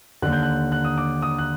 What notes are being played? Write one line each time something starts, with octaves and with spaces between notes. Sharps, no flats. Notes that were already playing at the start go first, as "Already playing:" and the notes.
D#2 D3 F#6
G6
F#6
F#6
D#6
D6
D#6
F#6